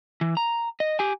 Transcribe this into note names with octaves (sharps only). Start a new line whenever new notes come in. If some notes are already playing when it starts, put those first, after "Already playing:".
E3
A#5
D#5
G4 G#5